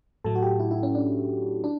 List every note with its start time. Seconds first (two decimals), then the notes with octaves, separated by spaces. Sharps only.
0.24 A2 F#3 A3 A4
0.35 F#4
0.42 G4
0.60 E4
0.71 E4
0.83 C#4
0.95 D4
1.64 D4